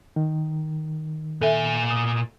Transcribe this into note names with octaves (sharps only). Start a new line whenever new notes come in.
D#3
A#2 A4 E5 G#5
D#6